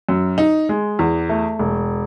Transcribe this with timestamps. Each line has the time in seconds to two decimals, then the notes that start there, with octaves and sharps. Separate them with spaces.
0.09 F#2
0.38 D#4
0.69 G#3
0.99 E2
1.29 A3
1.59 E1